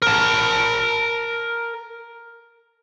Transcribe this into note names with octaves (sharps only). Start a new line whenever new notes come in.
A#4 A5